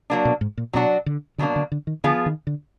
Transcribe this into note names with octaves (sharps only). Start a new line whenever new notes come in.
F#3 A#3 D4
B2
G#2
A#2
B2 F#3 D4 F#4
D3
B2 D3 F#3 A#3 D4
D3
D3
D#3
D3 F3 B3 F4 G#4
D#3
D3